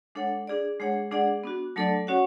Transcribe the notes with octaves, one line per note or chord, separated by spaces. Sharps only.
G#3 D4 A4 C#5 F#5
D4 G#4 D5
G#3 D4 G#4 C#5 F#5
G#3 D4 G#4 D5 F#5
B3 D4 F#4
F#3 A3 D4 A4 D5
C#4 F#4 C#5 F#5